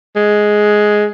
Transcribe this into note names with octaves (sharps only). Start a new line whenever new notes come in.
G#3